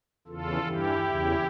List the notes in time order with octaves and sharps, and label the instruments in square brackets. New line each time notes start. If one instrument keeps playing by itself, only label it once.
[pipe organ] E2 C#3 E3 F4 A4
G2 E3 E4 G4
E2 C#3 E3